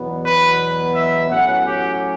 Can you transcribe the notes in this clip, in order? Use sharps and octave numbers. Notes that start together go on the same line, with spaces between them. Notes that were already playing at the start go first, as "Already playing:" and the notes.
Already playing: E2 B2 F#3 B3
B4
E5
A2 F#3 C#4 F#5
G4